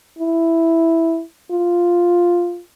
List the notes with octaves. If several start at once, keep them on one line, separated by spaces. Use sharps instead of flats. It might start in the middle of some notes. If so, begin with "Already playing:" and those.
E4
F4